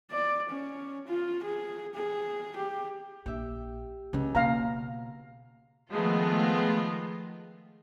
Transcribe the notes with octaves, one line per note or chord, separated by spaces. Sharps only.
D5
C#4
F4
G#4
G#4
G4
A#1 G4 E5
C#2 C#3 C#4
B2 A#3 F4 F5 A#5
D#3 F3 G#3 A3 B3 F4